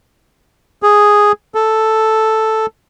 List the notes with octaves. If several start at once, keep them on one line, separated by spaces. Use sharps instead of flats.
G#4
A4